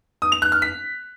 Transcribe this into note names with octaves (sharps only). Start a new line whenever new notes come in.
D#6
F7
F#6
F6
B6